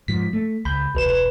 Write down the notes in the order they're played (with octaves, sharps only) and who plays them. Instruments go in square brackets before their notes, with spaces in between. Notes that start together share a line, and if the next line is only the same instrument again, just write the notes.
[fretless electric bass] G#2 F3 [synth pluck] B6
[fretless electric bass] A3
[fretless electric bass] C#2 [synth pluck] B5 G6
[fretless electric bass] E1 [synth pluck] C2 B4 E7
[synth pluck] B4 E7